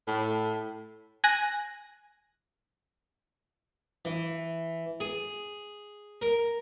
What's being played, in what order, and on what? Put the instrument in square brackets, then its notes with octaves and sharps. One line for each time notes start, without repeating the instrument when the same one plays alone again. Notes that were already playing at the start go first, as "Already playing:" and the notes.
[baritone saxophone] A2
[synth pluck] G#5 F#6 A#6
[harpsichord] E3
G#4
A#4